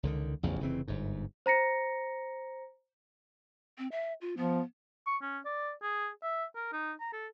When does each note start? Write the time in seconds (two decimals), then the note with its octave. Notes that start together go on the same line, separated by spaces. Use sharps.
0.03 C#2 D3 D#3
0.43 A1 E2 C#3 F3
0.60 F1 C#3 E3 C4
0.88 G1 G#2
1.46 C5 A#5 A#6 C#7
3.78 C4
3.92 E5
4.21 F4
4.37 F3 B3
5.07 C#6
5.22 C#4
5.45 D5
5.83 G#4
6.23 E5
6.55 A#4
6.73 D#4
7.00 A#5
7.13 A4